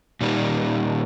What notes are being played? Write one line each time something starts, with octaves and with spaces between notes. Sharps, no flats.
A#2 D#3 G3